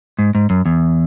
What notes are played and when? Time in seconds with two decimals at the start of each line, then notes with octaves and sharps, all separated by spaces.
0.19 G#2
0.35 G#2
0.50 F#2
0.66 E2